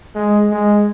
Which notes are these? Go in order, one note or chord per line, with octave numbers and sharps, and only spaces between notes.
G#3
G#3